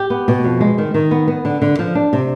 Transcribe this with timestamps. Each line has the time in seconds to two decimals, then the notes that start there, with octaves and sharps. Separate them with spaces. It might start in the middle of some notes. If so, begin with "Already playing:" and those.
Already playing: G4
0.10 B3
0.28 B2
0.44 F2
0.60 G#3
0.78 D#3
0.94 D#3
1.11 B3
1.28 B3
1.45 D3
1.62 D3
1.79 F3
1.95 D4
2.13 C3